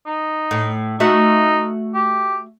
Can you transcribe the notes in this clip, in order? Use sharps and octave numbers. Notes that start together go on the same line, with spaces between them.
D#4
A2
A3 D#4 F#4 E5
G4